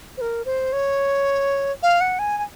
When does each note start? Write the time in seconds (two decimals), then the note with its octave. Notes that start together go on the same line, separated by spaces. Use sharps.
0.17 C5
0.21 A#4
0.45 C5
0.73 C#5
1.83 F5
2.01 F#5
2.19 G#5
2.38 G#5